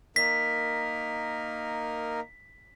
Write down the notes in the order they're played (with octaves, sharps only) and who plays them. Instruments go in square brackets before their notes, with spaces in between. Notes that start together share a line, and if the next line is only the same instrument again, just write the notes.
[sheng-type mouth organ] A#3 D#4 A#4 [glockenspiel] B6